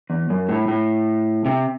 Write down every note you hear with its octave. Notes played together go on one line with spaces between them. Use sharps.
E2
F#2
A2
A2
C3